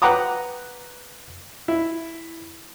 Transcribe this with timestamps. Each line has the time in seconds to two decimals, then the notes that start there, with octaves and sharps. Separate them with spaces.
0.02 B4 F#5 G5 A#5 D6 D#6
1.68 E4